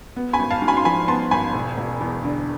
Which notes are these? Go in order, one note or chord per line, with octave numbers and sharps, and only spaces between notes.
B3
G#5 B5
G#1
F5 A5
G#2
G#5 B5
C6
F3 G#5 B5
B3 A5 C6
G#1 G#5 B5
E1
E1
E2
D3